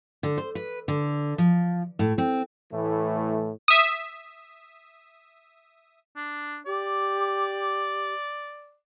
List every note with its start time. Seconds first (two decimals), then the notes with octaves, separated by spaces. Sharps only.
0.23 D3
0.38 C5
0.55 B4
0.88 D3
1.38 F3
1.99 A2
2.18 C4
2.73 A2 E3 A3
3.68 E5 D#6
6.16 D4
6.66 G4 D5